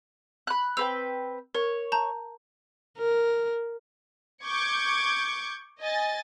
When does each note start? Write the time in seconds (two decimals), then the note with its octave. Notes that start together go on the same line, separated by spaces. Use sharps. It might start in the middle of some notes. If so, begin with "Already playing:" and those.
0.47 B5 F#6
0.77 C4 B4 G5 E6 F7
1.55 A#4 C#5
1.92 A5 A#5 G6
2.98 A#4
4.46 C#6 D6 G6 G#6 C#7
5.81 D#5 G#5 A6